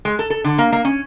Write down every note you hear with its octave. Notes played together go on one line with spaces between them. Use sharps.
G#3
A4
A4
D3
A#3
A#3
C#4